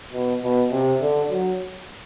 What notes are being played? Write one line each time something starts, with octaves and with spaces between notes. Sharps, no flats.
B2
B2
C3
D3
F#3